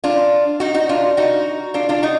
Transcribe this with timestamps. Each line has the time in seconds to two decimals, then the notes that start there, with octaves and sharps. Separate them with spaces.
0.04 D4 F4
0.60 D#4 F#4
0.74 D#4 F#4
0.89 D4 F4
1.17 D#4 F#4
1.74 D4 F4
1.89 D4 F4
2.03 D#4 F#4